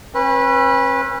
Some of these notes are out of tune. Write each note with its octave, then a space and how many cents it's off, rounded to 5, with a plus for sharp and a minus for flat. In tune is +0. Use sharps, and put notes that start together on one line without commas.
C#4 -45 B4 -20